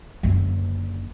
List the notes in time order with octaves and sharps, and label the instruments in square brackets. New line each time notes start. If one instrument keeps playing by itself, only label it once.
[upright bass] F#1 D3